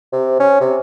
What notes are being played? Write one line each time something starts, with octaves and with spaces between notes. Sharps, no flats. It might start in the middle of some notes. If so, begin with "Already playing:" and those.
C3
C#4
C3